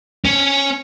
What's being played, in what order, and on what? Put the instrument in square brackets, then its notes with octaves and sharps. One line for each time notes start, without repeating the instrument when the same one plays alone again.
[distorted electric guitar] C#4